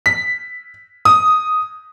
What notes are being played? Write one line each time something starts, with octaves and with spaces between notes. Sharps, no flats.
B6
D#6